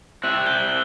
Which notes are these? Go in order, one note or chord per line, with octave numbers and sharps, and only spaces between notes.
C4 E4 G4 F#6 F#7
G6 G7